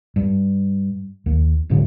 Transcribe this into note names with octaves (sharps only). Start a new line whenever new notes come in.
G2
D#2
D#1 G#2 D3